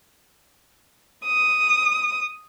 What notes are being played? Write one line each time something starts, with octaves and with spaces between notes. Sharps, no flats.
D#6